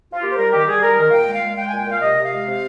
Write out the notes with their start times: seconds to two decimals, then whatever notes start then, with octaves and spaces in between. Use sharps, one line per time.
0.12 F4
0.23 A#3 G4
0.31 C5
0.37 G3 A#4
0.52 D#3 G4
0.67 G3 G#4
0.82 G3 A#4
0.97 D#3 A#4
1.08 F5
1.12 A#2 G5
1.27 G#3
1.35 F5
1.42 G#3
1.57 G#3 G5
1.69 A#2 G#5
1.79 G5
1.86 A#2 F5
2.01 C3 D#5
2.16 C3
2.24 F5
2.31 G#3
2.47 C3